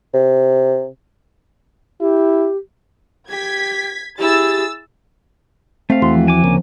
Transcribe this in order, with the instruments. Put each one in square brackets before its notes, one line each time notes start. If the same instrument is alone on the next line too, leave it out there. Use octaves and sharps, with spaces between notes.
[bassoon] C3
[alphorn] E4 [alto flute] G4
[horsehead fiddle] G4 [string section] G#6 B6
[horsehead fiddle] E4 G#4 [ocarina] G4 [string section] E6 A6
[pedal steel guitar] A3 F5 [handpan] C4
[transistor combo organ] E2 E3 F#4 [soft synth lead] C6
[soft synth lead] F3
[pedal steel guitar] G#5 D6
[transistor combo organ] D2 C#3 A#3